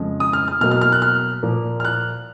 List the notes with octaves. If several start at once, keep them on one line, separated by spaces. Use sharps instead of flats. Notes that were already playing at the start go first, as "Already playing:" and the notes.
Already playing: F2 C#3 F3 G#3
D#6
F6
F6
B2 F#3 A#3 F6
F6
F6
F#6
F6
A#2 F3 A#3
F6
F#6